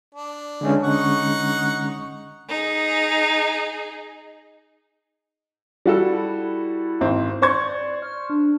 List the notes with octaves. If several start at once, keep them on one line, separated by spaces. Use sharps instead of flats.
D4
D3 G#3 C#4
D#4 F#5 C#6
D#4 G#4
G3 E4 F#4 A4
G#1 C4
C5 D5 C#6 G#6
F6
D4